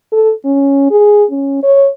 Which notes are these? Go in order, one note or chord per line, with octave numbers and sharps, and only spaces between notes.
A4
C#4
G#4
C#4
C#5